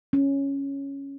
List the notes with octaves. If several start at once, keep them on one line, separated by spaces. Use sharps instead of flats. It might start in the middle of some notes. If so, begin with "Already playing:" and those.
C#4